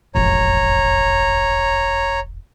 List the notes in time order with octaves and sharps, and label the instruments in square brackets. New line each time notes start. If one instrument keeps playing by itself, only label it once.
[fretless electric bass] E1 A1 F2 [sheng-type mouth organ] C#5 A#5